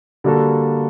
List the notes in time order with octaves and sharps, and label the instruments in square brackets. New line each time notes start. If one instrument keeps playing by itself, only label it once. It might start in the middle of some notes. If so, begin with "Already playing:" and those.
[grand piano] D3 G3 A#3 F#4 A4